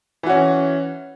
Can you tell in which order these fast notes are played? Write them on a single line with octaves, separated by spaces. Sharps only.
E3 F#4 C#4